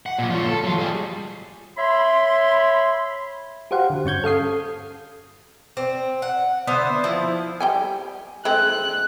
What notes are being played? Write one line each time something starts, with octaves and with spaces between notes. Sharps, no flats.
F#5
A#2 F3
F4 C#5
A4
F#3 F4
G3 G#4
C#5 E5 B5 C6
F#4 G4 C5 F5 F#5
D3
G2 C#4 C#6 G6 G#6
A4 F5 D#6 C7
C4
F#5
D3 B3 C5 E5
F3 E4
G3 G5 G#5
G#3 A3 C4 F#6